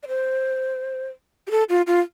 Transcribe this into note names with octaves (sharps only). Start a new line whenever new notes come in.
D5
C5
G4
A4
F4
F4